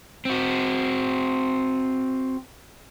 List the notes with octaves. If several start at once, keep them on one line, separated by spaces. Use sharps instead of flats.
C4 F#4